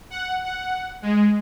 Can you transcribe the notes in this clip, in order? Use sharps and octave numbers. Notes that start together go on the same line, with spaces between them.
F#5
F#5
G#3